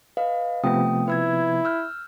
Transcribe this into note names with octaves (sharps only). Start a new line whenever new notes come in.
B4 D#5 F5
C3 F3 A3 B3 G5 D#6
E4 B4 E6 G#6
E6 F6 G6